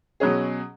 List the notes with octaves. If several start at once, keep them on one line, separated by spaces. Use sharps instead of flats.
B2 F#3 C#4 G#4